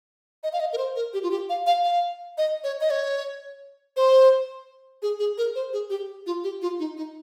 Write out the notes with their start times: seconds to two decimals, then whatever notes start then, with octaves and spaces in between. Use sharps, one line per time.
0.43 D#5
0.53 F5
0.60 D#5
0.73 A#4
0.78 C5
0.96 A#4
1.13 G4
1.23 F4
1.31 G4
1.49 F5
1.67 F5
1.84 F5
2.38 D#5
2.64 C#5
2.81 D#5
2.90 C#5
3.97 C5
5.02 G#4
5.19 G#4
5.38 A#4
5.55 C5
5.73 G#4
5.90 G4
6.26 F4
6.44 G4
6.62 F4
6.79 D#4
6.97 D#4